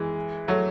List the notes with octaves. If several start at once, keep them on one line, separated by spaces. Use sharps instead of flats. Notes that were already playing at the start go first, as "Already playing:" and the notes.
Already playing: E3 G#3
F#3 A3